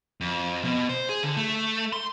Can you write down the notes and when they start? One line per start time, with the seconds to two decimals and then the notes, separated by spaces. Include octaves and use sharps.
0.21 F2
0.64 B2
0.89 C5
1.09 G#4
1.23 D3
1.37 A3
1.93 C6